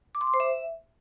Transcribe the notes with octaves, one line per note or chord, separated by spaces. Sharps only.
D6
C6
D6
C5
E5